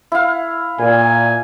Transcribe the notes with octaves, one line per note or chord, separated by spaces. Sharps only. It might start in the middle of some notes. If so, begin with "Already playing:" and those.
E4 F5
A#2 G#5